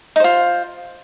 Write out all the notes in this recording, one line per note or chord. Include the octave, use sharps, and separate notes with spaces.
D#4 F4 C5